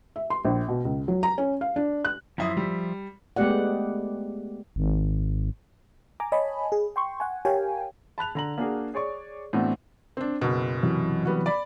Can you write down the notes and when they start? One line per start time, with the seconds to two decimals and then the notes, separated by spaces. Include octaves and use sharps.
0.16 E5
0.30 C6
0.45 A#1
0.69 B2
0.85 C#2
1.08 F#3
1.23 A#5
1.38 C#4
1.61 F5
1.76 D4
2.05 F#6
2.38 F#2 F3 E4 E5 C6 D#6
2.57 G3
3.36 G#3 A3 B3 G4 D5 F#5
4.76 G#1
6.20 G#5 A#5 D6
6.32 C#5 D#5 G#5 A5 B5
6.72 G#4
6.96 G5 C6 C#6
7.20 F#5 G#5
7.45 G4 A#4 C#5 F5 G5 G#5
8.18 A5 B5 F#6 F7
8.35 D3 A#5 F#7
8.58 A#3 D4 F#4 G#4 A#4
8.94 G#4 C#5 D5 C#6
9.53 A2 E3 B3 C4 D4 F#4
10.17 C4 D4
10.41 F#1 B2
10.83 C3 E3 F#3
11.25 G3 B3 F#4
11.46 D5 B5